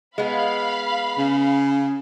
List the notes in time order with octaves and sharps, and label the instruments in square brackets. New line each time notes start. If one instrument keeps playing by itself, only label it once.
[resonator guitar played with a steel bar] G#3 B3 [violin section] F5 B5
[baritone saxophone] C#3